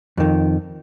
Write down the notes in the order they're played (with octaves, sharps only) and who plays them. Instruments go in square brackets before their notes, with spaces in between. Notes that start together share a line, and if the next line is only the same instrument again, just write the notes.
[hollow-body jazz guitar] F2 D#3